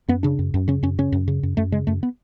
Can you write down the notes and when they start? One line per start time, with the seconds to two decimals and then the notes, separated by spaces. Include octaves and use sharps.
0.08 F#2 B3
0.23 C#3 D4
0.39 F#2
0.54 F#2
0.68 C#3 C#4
0.83 F#2 C#4
0.98 C#3 C#4
1.12 F#2
1.28 C#3
1.43 F#2
1.57 F#2 A3
1.72 C#3 G#3
1.87 F#2 A3
2.03 B3